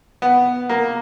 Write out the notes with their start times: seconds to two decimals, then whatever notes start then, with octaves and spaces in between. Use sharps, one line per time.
0.22 B3
0.70 A#3